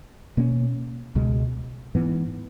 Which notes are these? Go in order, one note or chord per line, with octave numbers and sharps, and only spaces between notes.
B2 A#3 C#4
C#2 B2 G#3
G#2 E3 B3